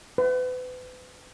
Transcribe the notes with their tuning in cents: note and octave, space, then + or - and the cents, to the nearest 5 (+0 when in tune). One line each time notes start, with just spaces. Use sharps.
B4 +35